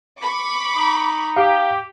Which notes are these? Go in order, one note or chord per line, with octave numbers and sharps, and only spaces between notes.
B5 C#6 D6
D#4
G4 F5